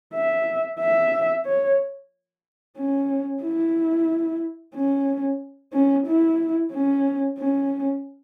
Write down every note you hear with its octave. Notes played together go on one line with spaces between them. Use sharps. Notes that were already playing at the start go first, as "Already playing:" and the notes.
E5
E5
C#5
C#4
E4
C#4
C#4
E4
C#4
C#4